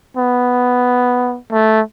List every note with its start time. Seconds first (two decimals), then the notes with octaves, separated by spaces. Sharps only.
0.17 B3
1.52 A3